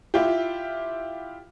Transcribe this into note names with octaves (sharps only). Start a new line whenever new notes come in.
E4 F4 G4